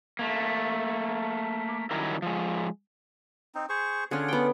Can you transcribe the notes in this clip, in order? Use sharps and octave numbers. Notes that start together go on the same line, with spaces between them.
A3 A#3
D#3 F#3 G3 C#4 E4 A#4
F3 G#3
C4 D#4
G#4 C5 C#6
D3 C#4 F4 G#4 F#5
B3 G5